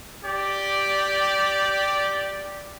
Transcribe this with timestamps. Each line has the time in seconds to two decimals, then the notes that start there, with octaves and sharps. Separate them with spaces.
0.23 G4 D5